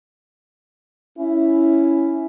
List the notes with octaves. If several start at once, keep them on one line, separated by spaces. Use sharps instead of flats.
C#4 E4